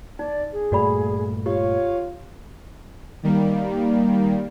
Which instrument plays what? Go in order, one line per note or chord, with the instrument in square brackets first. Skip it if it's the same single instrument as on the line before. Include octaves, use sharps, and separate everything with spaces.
[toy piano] D#4 [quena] D5
[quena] G#4
[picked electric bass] G2 A#2 A3 [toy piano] F#4 D5 B5
[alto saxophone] F4 [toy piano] G4 [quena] C#5
[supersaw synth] D#3 G3 A#3